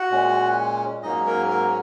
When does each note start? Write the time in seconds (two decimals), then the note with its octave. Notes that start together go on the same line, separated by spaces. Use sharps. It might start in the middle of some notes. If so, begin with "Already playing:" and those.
Already playing: F#4 F#5
0.10 A#2 G#3 C#4
1.03 G#2 F#3 A#3 C#4 D#4 D#5
1.26 A#3 A#4
1.50 A#3 A#4